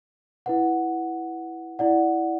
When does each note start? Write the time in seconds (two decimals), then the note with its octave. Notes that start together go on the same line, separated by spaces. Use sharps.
0.46 E4 B4 F#5
1.79 E4 D5 F#5